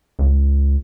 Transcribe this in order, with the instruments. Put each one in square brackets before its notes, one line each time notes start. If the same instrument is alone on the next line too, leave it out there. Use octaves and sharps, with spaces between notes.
[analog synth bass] C#2